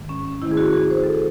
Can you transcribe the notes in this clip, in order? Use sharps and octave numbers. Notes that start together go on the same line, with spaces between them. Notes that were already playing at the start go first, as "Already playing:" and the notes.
Already playing: G#2 D#3 G#3
C#4
C#4
C3 D#3 A3 E4
G#4
F#4
G#4
C5
A4